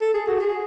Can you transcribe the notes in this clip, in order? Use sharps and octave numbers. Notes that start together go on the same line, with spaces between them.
A4
G#4
F#4
G#4